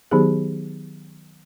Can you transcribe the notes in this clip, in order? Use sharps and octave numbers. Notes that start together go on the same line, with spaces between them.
D#3 F#3 B3 D#4 G4 G#4